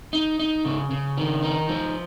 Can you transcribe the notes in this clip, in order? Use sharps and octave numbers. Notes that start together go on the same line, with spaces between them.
D#4
D#4
C#3
C#3
D#3
D#4
F3